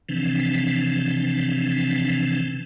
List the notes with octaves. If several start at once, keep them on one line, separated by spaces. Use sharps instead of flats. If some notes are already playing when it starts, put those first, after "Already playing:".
C3 E3 F3 C4 D4